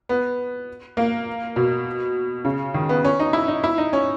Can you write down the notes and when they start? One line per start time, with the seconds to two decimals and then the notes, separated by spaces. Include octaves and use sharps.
0.09 B3
0.97 A#3
1.56 B2
2.45 C#3
2.74 D#3
2.89 B3
3.05 C#4
3.20 D#4
3.33 E4
3.48 D#4
3.64 E4
3.78 D#4
3.93 C#4